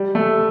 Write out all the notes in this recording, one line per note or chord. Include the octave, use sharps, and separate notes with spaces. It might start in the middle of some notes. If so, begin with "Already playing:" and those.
Already playing: G3
A3